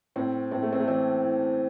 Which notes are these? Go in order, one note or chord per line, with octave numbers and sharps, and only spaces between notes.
A2 C4
A2 C4
A3
C4
A3
E3 C4
E3